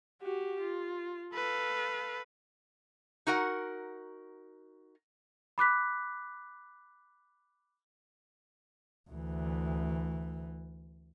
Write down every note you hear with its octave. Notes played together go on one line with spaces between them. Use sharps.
F#4 G4
F4
A4 B4 F5
D#4 F#4 A#4 F#5
B5 D6 F#6 B6
D2 E3